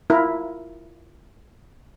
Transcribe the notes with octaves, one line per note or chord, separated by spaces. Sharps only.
E4 F4 A#4